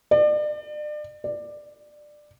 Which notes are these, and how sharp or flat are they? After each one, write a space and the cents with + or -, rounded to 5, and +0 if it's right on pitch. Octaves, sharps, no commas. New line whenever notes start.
D5 +35
D5 +15